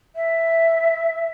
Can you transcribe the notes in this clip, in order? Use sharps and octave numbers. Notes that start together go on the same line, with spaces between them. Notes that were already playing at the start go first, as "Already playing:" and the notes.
E5